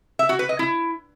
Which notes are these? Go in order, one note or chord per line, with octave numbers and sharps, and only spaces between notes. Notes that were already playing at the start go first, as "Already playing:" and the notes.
E5
F#4
B4
D#5
E4